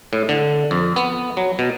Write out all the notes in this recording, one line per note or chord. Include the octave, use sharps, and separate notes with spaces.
A2
D3
F2
B3
F#3
B2